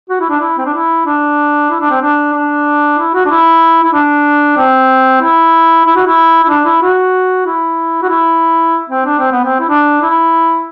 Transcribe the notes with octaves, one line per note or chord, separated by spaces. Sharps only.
F#4
E4
D4
E4
C4
D4
E4
D4
E4
D4
C4
D4
D4
E4
F#4
D4
E4
E4
D4
C4
E4
E4
F#4
E4
E4
D4
E4
F#4
E4
F#4
E4
C4
D4
C4
B3
C4
E4
D4
E4